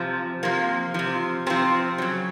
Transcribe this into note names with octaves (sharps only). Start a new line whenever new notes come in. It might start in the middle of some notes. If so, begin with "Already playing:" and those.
Already playing: C3 F3
C3 F3 A#3
C3 F3
C3 F3 C4
C#3 F#3